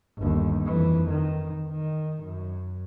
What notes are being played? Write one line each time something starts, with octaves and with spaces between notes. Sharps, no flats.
G1 D#2
F2 E3
D#3
D#3
F#2